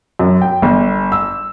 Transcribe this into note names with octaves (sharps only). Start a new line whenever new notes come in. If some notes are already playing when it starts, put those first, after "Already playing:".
F#2
G5
G1
E6